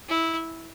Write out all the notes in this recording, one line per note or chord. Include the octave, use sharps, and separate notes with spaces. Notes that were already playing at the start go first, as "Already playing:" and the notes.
E4